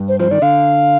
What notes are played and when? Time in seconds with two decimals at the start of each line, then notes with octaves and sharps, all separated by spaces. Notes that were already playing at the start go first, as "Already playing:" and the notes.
Already playing: G2
0.08 C5
0.20 F3 C5
0.31 D#3 D5
0.42 D3 F5